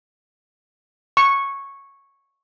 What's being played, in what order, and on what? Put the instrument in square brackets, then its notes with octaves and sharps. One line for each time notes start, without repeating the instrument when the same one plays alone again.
[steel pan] C#6